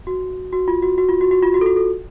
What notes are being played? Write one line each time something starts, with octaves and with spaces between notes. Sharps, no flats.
F#4
F#4
F4
F#4
F#4
F4
F#4
F#4
F4
F#4
A4
F#4
A4